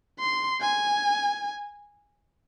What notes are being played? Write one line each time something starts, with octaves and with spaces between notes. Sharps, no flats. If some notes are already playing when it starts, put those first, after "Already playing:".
C6
G#5